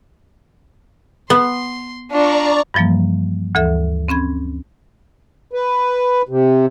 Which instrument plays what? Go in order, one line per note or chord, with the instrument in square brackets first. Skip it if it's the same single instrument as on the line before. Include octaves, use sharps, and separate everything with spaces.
[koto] B3 [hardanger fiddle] C6
[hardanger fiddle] D4 F4 [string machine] D5 A#5 C#6
[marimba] G2 E3 F3 G3 A#3
D2 E3 A4 E5
C4 C#4 B5 G#6
[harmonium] B4
C3